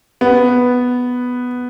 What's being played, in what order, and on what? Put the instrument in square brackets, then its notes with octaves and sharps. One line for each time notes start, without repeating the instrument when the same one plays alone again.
[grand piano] B3